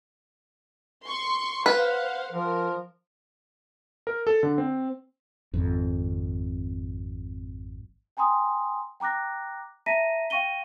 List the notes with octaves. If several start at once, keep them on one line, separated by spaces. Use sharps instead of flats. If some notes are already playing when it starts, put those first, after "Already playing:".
C6 C#6
B4 C5 F5 F#5
F3 A#4
A#4
A4
D3
C4
G#1 F2
G5 G#5 A#5 C6 D#6
G5 A#5 D6 F#6 A#6
E5 A5 A#5 A#6 B6 D#7
F5 G5 C#6 A#6 D#7 G7